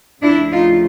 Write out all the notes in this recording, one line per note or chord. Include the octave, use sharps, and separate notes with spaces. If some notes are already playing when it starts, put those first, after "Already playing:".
D2 C#3 F3 A3 D4 E4
D#4 F4